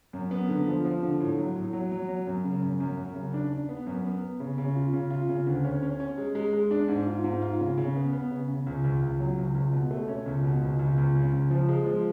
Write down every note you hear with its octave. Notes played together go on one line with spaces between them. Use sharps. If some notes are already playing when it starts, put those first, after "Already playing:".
F#2
B3
D3
F3
F3
D3
A2
F#3
A2
F#3
F#3
F#3
F#2
C#3
F#2
F#2
F#2
C#3
D4
D4
B3
F#2
B3
B3
C#3
C#3
F4
C#3
F4
C#3
D2
C#4
C#4
C#4
G#3
G#3
G#3
D4
G#2
F4
G#2
F4
C#3
C#3
B3
B3
C#3
C#3
C#2
C#2
C#2
F#3
C#2
C#2
B2
A3
C#4
C#2
B2
C#2
C#2
C#2
C#3
C#2
F3
G#3
F3